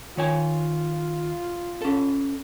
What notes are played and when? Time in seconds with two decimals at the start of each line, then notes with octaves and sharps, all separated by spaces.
0.17 D#3 F4 C#5 G#5
1.82 C#4 A4